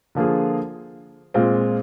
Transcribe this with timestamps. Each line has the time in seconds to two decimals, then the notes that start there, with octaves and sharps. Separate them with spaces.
0.15 D3 F3 A#3 F4 G#4
1.34 A#2 G#3 C4 F4